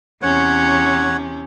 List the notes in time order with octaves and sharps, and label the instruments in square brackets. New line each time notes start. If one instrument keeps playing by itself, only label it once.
[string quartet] E2 C3 C#4 [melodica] C#5 F#5